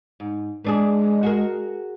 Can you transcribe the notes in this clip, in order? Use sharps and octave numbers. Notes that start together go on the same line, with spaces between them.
G#2
E3 G#3 D4 G#4
F#4 G#4 A#4